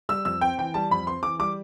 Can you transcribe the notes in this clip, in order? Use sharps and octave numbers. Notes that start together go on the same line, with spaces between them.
G3 E6
F2 E6
C4 G5
E3 G5
G3 A5
F2 B5
C4 C6
E3 D6
G3 D6